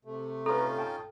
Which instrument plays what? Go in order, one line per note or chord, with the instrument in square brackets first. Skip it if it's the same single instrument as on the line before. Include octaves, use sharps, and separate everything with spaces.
[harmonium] C3 A3
[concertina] C#4 D#4 F4 [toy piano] A4 [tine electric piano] B4 A#5
[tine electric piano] G5 A5